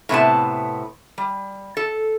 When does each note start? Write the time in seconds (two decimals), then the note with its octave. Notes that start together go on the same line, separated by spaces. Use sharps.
0.09 A2 C3 B3 A5
1.18 G3
1.77 A4